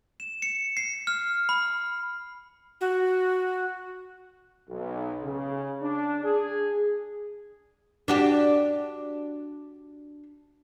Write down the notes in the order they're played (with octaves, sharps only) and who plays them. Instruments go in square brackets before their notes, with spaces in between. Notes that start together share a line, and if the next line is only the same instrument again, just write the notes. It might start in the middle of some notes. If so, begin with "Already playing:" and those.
[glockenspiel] E7
C#7
C7
F6
B5
[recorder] F#4
[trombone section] B1
C#3
D4
G#4
[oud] D4 F#4 G4